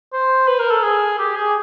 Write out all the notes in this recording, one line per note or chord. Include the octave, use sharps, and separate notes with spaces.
C5
B4
A#4
A4
G#4
G4
G#4